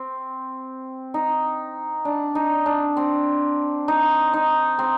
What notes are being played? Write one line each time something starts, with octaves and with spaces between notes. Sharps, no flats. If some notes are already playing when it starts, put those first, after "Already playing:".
Already playing: C4
D#4
D4
D#4
D4
C4
D#4
D#4
C4